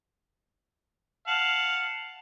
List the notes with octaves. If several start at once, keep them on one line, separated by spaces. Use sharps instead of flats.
F5 F#5 A5